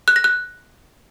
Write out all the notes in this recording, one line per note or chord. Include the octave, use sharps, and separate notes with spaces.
F#6
A#6
F#6